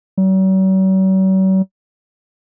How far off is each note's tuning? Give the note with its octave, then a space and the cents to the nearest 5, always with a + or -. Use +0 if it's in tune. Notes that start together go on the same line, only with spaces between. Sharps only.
F#3 +45